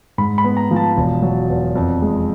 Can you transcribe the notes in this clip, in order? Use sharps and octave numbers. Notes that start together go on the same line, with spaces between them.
G#2 B5
B5
B3
A#5
F3
A5
E1
F#3
E2
F2
G#3